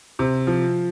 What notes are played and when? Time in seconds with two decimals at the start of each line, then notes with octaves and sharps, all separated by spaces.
0.19 C3
0.47 F3